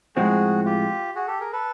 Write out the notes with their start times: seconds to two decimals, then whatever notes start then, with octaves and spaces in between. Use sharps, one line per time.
0.16 A2 F3 G#3 C4 F#4 G#4
0.65 F4 G4
1.15 F#4 G#4
1.28 G4 A4
1.40 G#4 A#4
1.53 A4 B4